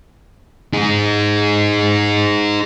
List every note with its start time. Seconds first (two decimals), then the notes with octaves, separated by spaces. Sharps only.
0.73 D#4 G#4